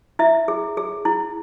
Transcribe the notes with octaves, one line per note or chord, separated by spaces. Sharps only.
E4 E5
G#4
G#4
E4